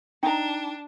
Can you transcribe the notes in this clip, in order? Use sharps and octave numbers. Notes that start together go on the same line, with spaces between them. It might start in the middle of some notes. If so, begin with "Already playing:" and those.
D4 D#4 G5 A#5